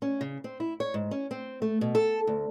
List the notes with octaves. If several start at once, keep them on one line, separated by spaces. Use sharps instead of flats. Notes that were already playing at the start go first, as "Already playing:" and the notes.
C#4
C#3
C4
E4
C#5
G#2
C#4
C4
A3
B2
A4
D2